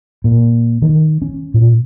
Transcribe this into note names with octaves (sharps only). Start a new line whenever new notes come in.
A#2
D#3
C#4
A#2